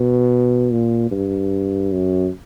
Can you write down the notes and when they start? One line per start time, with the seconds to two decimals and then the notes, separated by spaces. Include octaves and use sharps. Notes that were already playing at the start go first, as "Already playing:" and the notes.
Already playing: B2
0.71 A#2
1.11 G2
1.92 F#2